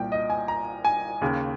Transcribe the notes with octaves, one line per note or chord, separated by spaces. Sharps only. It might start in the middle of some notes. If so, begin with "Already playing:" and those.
Already playing: C2 A#2 G5
D#5
G#5
A#5
G#5
D#2 C#3